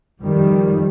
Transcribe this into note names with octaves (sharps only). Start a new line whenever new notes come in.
F2 D#3 G3